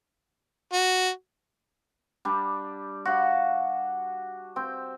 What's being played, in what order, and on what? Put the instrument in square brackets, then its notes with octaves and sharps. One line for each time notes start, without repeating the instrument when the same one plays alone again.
[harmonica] F#4
[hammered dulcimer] G3 D4
F#4 F5
C4 G5